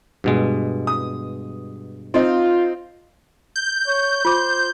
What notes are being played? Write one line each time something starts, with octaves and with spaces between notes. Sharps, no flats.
G2 B2 G#3
D#6
C4 D#4 F4
G6
C#5
F4 C5 D6